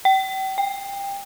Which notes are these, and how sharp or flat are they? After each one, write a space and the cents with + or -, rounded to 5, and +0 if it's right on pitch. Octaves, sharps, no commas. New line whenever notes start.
G5 -35
G5 +25